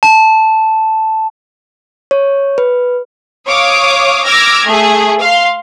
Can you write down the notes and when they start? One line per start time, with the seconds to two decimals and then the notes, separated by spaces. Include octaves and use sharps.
0.03 A5
2.11 C#5
2.58 B4
3.47 C#5 F5 D6 D#6
4.26 D6 E6 F6 G#6 A#6
4.66 A3 G#4
5.22 F5 C6